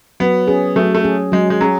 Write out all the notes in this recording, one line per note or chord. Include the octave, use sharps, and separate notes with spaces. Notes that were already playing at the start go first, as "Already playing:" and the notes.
F#3 B3
C#4 G#4
F#3 A3
A3
C#4 G#4
F#3 G#3
G#3
F#3 C#4 G#4